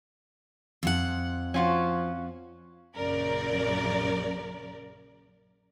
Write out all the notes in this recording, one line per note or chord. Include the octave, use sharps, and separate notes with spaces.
F2 C5 F#5
F3 C#4 F4 F#4
A#1 F#2 C#3 A#4 D5